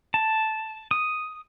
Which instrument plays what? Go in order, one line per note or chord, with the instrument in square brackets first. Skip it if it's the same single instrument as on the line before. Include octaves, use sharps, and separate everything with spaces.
[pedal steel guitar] A5
D#6